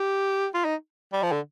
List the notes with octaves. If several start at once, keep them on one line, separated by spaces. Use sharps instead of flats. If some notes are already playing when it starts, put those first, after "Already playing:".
Already playing: G4
F4
D#4
G3
F3
D3